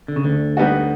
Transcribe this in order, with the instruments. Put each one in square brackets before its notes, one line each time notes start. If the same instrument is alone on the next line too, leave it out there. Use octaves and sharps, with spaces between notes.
[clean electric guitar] D3
C#3
D2 D3
[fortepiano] G3 B3 D#4 F#4